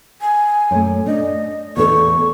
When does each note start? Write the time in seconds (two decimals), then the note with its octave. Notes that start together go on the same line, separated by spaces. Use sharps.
0.21 G#5
0.71 F#2 A3
1.07 D4 D#5
1.77 E2 A4 C#6